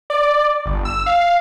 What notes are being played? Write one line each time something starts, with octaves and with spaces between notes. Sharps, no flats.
D5
G1
E6
F5